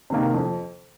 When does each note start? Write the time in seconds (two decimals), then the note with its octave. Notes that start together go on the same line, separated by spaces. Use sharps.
0.10 C3 D#3 A#3
0.34 F2